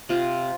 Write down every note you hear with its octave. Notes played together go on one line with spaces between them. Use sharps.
C3 F4